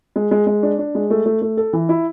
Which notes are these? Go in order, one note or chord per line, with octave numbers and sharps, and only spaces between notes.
G#3
G#3
G#3
D4
D4
G#3
A3
A3
A3
A4
E3
E4